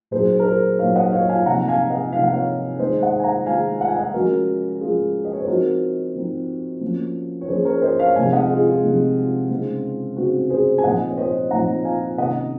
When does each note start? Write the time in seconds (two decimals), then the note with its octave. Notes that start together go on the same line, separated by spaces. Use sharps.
0.11 A#2 F#3 A#3 D#4 G#4 C5
0.39 A#4
0.45 G#4 C5
0.78 A#2 F#3 A#3 D#4 C#5 F5
0.95 D#5 F#5
1.12 C#5 F5
1.29 F5 G#5
1.46 C3 F3 A#3 D#4 F#5 A#5
1.68 F5 G#5
1.90 D#5 F#5
2.13 C3 F3 A#3 D#4 F5
2.23 F#5
2.33 C#5 F5
2.79 D#3 G#3 D#4 C5 D#5
3.02 D#5 F#5
3.19 G#5
3.24 F#5 A#5
3.46 D#3 G#3 D#4 F5 G#5
3.81 F#5
3.88 G#5
3.96 D#5 F#5
4.13 F3 G#3 C#4 F#4 A#4
4.80 F3 G#3 C#4 F4 G#4
5.25 D#5
5.33 C#5
5.41 C5
5.47 F3 C4 D#4 F#4 A#4
6.15 F3 C4 D#4
6.81 F3 A#3 C#4
7.41 C#5
7.49 F3 A#3 C#4 G#4 C5
7.65 A#4 C#5
7.82 C5 D#5
7.99 C#5 F5
8.15 C3 F3 G#3 D#4 F5 G#5
8.32 D#5 F#5
8.49 F4 G#4
8.67 F4 G#4
8.83 C3 F3 G#3 D#4
9.50 C#3 G#3 C4 D#4
10.17 C#3 G#3 C4 D#4 F#4
10.50 G#4 C5
10.78 G#5
10.84 A#2 F3 C4 D#4 D#5 F#5
11.10 C#5
11.17 C5 D#5
11.50 A#2 F3 C4 D#4 F#5 A#5
11.84 F5 G#5
12.18 C3 D#3 A#3 C#4 D#5 F#5